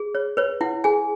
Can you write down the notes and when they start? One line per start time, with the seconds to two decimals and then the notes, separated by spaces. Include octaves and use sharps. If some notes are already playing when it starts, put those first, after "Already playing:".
Already playing: G#4
0.15 C#5
0.37 B4 C#5
0.61 E4 F#5
0.84 G#4 G#5